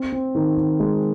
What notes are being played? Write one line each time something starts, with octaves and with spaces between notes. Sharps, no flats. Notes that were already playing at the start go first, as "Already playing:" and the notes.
Already playing: C4
C4
D#3
D#3
G#3